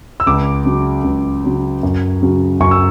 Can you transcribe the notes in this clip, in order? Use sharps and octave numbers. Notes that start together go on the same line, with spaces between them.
E6
C#2 D6
C#3 F#3
C#2
C#3 F#3
F#2
C#3 F#3
F#2 C#6
E6